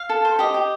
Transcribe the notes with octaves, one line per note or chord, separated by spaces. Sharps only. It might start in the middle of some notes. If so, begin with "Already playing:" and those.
Already playing: F5
A4
C5
G4 D#5
G4